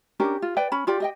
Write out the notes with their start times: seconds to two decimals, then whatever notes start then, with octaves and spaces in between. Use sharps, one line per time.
0.20 C#4 D4 G4 A#4
0.42 F4
0.57 B4 D5 G5
0.72 C#4 B5
0.87 F4 G4 D5
1.00 G4 D#5 G5